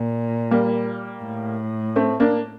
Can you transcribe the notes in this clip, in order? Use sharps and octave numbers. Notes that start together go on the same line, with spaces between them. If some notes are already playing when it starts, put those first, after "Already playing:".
Already playing: A#2
G3 A#3
A2
A3 C4
A#3 D4